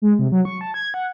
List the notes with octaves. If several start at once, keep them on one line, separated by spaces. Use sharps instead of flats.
G#3
C3
F#3
C#6
A5
G#6
F#5